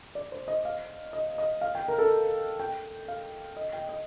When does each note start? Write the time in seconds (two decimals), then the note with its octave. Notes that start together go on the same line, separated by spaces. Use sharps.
0.15 D5
0.32 C5
0.48 D#5
0.65 F5
1.13 D#5
1.38 D#5
1.61 F5
1.75 G5
1.88 A#4
1.98 A4
2.60 G5
3.08 F5
3.57 D#5
3.73 G5
3.89 D#5